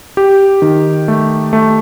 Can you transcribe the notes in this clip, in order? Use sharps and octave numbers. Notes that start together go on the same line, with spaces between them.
G4
D#3
A3
A3